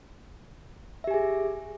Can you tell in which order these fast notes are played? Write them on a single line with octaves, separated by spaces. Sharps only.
E5 G4 G#5 G#4